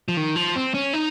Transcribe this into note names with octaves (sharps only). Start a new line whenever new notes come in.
F3
D#3
F3
C4
C#4
D#4